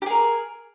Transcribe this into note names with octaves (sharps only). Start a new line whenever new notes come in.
G4 G#4 A#4